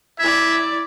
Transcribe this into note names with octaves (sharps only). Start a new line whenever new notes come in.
E4 D5 E5 G#6